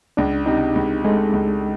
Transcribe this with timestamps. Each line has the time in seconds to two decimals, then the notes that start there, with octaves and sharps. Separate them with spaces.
0.17 C#2 D4
0.46 C3 D#4
0.76 C#2
1.05 G#3 A3
1.33 C#2